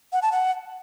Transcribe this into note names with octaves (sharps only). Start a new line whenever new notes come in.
F#5
A5
F#5